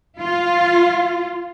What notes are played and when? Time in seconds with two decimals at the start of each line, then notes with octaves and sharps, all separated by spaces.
0.20 F4